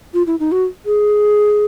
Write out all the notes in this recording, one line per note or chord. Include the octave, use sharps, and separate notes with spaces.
F4
E4
D#4
F#4
G#4